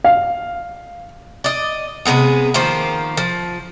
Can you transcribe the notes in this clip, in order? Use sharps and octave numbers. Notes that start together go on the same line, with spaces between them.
F5
D5 D#5
C3 G#3 B3 G#4
D#3 F3 A#3 C5
F3